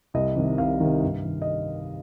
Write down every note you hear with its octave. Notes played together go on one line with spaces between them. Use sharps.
C2 D#5
C3 D#3
C2 F5
C3 D#3
G2
D#3
D#5